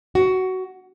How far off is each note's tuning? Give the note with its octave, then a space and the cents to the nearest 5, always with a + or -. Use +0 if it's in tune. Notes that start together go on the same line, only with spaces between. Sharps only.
F#4 +15